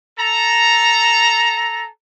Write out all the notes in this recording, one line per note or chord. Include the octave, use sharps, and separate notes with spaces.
A4 A#5